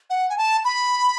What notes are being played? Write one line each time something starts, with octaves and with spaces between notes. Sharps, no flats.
F#5
G#5
A5
B5